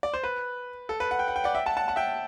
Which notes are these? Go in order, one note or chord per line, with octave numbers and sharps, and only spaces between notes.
D5
C5
B4
A4
B4
F#5
G5
F#5
G5
D5 F#5
E5 G5
F#5 A5
F#5 A5
F#5 A5
E5 G5